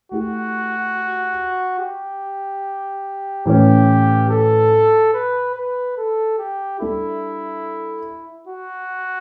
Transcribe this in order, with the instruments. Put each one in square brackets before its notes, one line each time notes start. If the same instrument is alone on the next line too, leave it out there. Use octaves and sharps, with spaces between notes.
[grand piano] A3 E4 G4 [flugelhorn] F#4
[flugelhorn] G4
[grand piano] A2 E3 A3 C#4 [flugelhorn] G4
[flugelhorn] A4
B4
B4
A4
G4
[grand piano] G3 D4 A4 [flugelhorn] E4
[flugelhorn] F#4